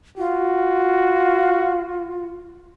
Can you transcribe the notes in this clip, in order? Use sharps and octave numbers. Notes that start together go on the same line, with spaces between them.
F4 F#4